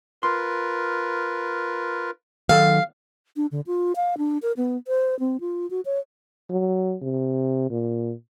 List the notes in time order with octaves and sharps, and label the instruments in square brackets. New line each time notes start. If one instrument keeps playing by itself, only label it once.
[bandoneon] F4 A#4 B4 [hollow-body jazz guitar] C6
[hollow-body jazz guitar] D#3 F#3 A4 [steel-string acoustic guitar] F5
[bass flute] D4
D3
F4
F5
D4
A#4
B3
C5
C4
F4
F#4
C#5
[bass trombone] F#3
C3
A#2